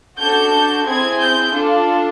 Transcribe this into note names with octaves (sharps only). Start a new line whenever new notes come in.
D4 F#4 A4 G6
C4 E4 G#4 G#6
G6
D4 F4 A4